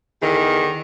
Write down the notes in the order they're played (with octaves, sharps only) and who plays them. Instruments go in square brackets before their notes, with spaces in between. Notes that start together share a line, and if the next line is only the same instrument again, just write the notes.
[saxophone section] E2 D3 D#3